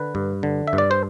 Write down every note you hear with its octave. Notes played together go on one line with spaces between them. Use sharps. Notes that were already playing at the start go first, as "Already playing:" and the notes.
Already playing: D3 B4
G2
D3
E5
G2
D5
C5